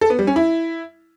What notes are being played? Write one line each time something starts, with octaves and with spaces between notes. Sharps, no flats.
A4
B3
G3
C#4
E4